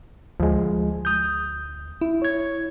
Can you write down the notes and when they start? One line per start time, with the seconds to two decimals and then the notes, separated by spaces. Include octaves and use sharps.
0.40 D2 F3 G#3
1.05 D#6 G6
2.01 E4
2.22 C#5 G#6